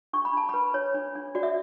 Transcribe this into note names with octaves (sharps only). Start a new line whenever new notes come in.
D4 C#6
B5
D4 A5
B5
B4
D4 C#5
D4
D4
F#4 D5
E5